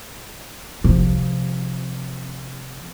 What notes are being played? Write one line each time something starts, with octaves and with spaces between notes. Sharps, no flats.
C3 F3